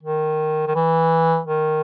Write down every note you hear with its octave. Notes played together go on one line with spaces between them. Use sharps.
D#3
D#3
E3
D#3